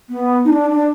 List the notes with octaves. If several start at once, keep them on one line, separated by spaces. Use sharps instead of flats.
B3
D#4
D4
D4